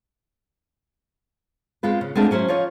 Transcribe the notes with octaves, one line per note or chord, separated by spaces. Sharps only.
G#3 C4 F4 B4
C#3
G#3 A3 B3 C4 D4 F4
F#3 C#4 E4 C5
F3 F4 C#5 D#5